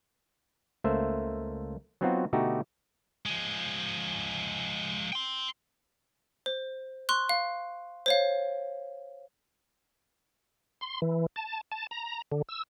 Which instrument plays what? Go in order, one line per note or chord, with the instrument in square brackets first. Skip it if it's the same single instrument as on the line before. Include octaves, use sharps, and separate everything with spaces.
[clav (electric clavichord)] C#2 A3 A#3 C5 E5
F#3 B3 C4 D#4 F4 F#4
B2 D3 A3 D#4 F#4 G4
[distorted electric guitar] F3 G#3
G5 C6
[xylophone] C5
C6 C#6 F#6
F5
C5 C#5 F5
[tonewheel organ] C6
E3
A5
A5
A#5
D3
E6